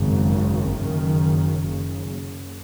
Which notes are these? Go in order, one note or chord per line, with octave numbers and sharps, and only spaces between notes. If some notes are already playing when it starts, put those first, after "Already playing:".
Already playing: G#1 F#2 C#3
D#3
F#1 F#2 C#3
F#1 F#2 C#3